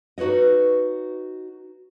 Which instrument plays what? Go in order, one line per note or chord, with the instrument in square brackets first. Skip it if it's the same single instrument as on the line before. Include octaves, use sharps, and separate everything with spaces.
[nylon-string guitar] D#4 F#4 B4 C#5 D#5